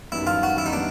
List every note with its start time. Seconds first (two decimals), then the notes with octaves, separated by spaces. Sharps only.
0.12 F#2 D#3 G3 B3 E4
0.27 F4
0.43 F#4
0.58 E4
0.66 D#4
0.73 G3 B3 D4